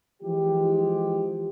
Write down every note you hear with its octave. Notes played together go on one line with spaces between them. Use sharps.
E3 F3 G#3 G4